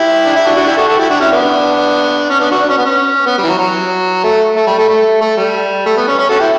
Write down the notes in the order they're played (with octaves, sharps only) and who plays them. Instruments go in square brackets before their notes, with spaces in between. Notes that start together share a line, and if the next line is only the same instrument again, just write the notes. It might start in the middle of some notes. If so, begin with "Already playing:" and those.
Already playing: [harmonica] E4 G4
D4
E4
D4 F#4
D4 F#4
E4 G4
F#4 A4
F#4 A4
E4 G4
D4 F#4
C#4 E4
B3 D4
C#4
B3 D4
D4 F#4
D4
C#4
B3
C#4
B3
G3
E3
F#3
F#3
A3
A3
G3
A3
A3
A3
G3
A3
B3
C#4
C#4
F#4 A4
E4 G4